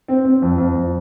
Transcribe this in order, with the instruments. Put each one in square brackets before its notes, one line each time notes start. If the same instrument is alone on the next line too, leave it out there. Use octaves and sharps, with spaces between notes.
[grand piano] C4
C4
F2
F2
F2